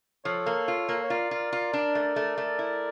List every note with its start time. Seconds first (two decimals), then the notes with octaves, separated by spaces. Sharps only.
0.25 F3 A4 C#5
0.46 A#3
0.68 F4
0.89 A#3
1.03 C#5
1.09 F4 A#4 D5
1.31 F4
1.52 F4
1.73 D4
1.95 A3
2.16 A3
2.38 A3
2.59 E4